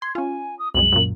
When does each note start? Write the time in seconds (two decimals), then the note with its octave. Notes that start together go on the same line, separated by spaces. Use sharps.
0.02 C6 G#6
0.15 C#4 F4 G#5
0.59 D#6
0.74 C2 F#2 G#3 F#7
0.92 F#2 A#2